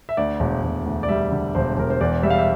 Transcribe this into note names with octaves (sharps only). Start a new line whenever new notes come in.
E5
D2 D5
E1
E1
D2
D5
G3 E5
D3
E1 C5
E1 A#4
C5
E2 D5
G3 E5
F5
E5